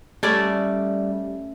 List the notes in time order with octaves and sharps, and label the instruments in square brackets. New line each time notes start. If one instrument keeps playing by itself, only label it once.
[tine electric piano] G3 [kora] A3 C#4 D5